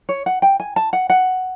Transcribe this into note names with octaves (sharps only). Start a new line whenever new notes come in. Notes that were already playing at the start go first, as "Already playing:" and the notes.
C#5
F#5
G5
G#5
A5
F#5
F#5